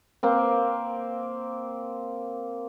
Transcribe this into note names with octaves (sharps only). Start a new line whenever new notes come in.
A#3 C4